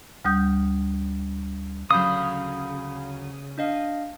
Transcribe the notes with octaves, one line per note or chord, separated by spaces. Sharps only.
D2 G3 D#6 G6
D2 C#3 F#3 F5 B5 D#6 G6
D4 D#5 F5